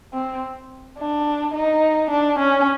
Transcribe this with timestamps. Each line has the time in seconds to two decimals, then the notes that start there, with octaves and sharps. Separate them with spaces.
0.14 C4
0.98 D4
1.54 D#4
2.11 D4
2.39 C#4